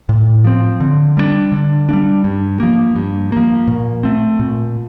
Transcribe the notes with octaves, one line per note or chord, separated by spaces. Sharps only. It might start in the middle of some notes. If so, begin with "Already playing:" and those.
A2
F3 C4
D3
G3 A#3 D4
D3
G3 A#3 D4
G2
F3 A#3
G2
F3 A#3
A#2
A3 C4
A#2